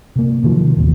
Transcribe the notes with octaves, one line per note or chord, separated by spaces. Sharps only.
C3 A#3
C3 D#3 F3 F#3
A1 D#2